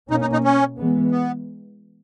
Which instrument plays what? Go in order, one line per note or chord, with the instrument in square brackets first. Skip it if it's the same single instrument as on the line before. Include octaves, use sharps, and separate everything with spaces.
[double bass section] B2 A#3 C#4 [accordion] D#4
[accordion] D#4
D#4
C#4
[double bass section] E3 G#3 B3
[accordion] B3